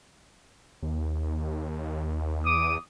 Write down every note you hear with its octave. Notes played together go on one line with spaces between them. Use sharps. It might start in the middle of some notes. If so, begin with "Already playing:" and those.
D#2
E2 D6 D#6